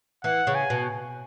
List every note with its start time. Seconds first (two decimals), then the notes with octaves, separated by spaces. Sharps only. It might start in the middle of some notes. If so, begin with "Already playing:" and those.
0.24 E3 F#5
0.47 C#3
0.55 G#5
0.70 B2